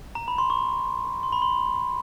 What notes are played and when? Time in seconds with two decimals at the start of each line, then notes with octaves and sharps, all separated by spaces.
0.15 A#5
0.28 B5
0.38 C6
0.50 C#6
1.23 C6
1.32 B5
1.42 C6